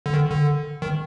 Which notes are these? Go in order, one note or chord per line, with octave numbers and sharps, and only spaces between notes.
D3
D#3
D3
D#3